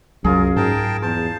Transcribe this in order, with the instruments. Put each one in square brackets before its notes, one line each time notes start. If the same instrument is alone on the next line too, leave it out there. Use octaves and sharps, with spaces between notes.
[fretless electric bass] C2 F#3 [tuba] F#2 [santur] F4 G#4 [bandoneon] A#4
[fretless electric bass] G#2 [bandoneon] A#4 G5 A5
[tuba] E2 [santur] C5 [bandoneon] A5